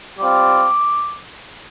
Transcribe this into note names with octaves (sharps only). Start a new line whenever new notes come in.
G3 C4 F4 D6